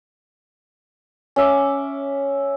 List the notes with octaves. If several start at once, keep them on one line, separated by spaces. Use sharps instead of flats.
C#4 E5 D6